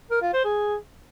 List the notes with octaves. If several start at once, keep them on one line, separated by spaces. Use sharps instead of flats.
A#4
F4
C5
G#4